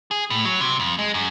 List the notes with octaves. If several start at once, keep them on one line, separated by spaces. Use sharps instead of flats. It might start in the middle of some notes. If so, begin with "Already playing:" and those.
G#4
A2
F#3
C3
F2
G#3
F#2